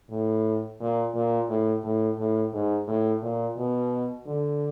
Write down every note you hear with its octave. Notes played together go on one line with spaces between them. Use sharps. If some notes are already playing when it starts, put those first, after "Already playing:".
A2
A#2
A#2
A2
A2
A2
G#2
A2
A#2
B2
D3